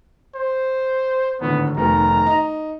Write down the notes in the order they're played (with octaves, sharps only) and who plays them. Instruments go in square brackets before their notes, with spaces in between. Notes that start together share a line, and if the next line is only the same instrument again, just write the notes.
[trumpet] C5
[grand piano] G#1 A2 D3 [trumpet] B3
[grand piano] F1 D#3 B3 [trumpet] A#5
[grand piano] D#4